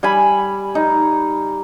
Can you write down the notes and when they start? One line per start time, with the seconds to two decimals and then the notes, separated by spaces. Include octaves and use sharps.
0.03 G3 G#5 B5
0.75 D#4